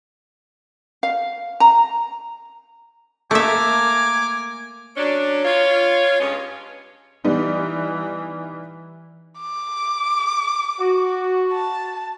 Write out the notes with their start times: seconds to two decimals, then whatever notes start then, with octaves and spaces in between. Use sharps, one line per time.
1.03 F5
1.60 A#5
3.31 A3 A#3 E5 G#5 A#5 D6
4.97 F#3 C#4 D4
5.44 F4 C#5
6.20 G2 G#3 B3 C#4
7.25 E3 G3 B3 D#4
9.41 D6
10.79 F#4
11.53 A5